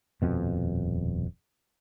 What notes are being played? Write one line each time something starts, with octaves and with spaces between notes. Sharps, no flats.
D#1 F2 B2